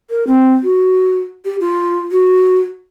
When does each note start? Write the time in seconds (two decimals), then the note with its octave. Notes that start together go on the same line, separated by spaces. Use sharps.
0.10 A#4
0.27 C4
0.63 F#4
1.45 G4
1.60 F4
2.12 F#4